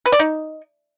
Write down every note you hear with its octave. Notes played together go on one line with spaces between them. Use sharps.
B4
D5
D#4